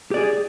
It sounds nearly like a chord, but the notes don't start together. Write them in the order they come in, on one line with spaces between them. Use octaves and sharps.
G4 D5 G#4